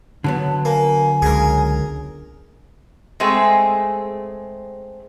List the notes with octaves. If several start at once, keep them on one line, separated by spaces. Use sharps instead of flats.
D3 F#3 B3 A5
A#3 G#5
C#2 G#4 A#4
G#3 A3 C4 G#4